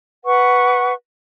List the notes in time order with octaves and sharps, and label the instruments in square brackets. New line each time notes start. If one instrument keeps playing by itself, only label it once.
[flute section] B4 F#5 C#6